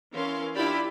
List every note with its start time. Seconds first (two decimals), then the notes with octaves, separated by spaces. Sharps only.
0.12 E3 C#4 A#4 F5 C6
0.54 D4 E4 F4 G4 D5 B5